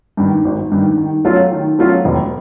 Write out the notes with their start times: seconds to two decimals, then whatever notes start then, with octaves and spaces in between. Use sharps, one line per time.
0.17 G2 D#3
0.45 G#1
0.72 G2 D#3
0.98 D#3
1.25 F#3 A3 C#4 F4
1.52 D#3
1.79 F#3 A3 C#4 F4
2.05 E1